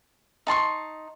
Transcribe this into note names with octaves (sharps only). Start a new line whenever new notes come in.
D#4 A5 C6 C#6